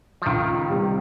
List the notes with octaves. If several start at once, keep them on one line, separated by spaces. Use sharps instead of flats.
F3
C#2 D#3
C3 G3